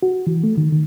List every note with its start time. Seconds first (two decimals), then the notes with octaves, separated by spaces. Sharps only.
0.03 F#4
0.27 E3
0.44 A3
0.57 D#3
0.72 D#3